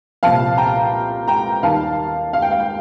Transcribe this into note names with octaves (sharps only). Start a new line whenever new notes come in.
C2 A#2 F3 F5 A5
G5 A#5
G5 A#5
D#2 D#3 G3 F5 A5
F5
G5
F5
G5